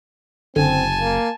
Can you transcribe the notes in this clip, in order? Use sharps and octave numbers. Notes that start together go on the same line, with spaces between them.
F#1 D3 C4 G#5 A5
A#3